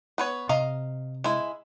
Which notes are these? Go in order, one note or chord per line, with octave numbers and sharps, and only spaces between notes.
B3 B4 C#5
C3 D#5 F5 A#5
G#3 E4